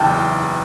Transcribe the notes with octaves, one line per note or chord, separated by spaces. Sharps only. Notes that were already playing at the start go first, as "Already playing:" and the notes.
Already playing: F#1 E2 G5 A5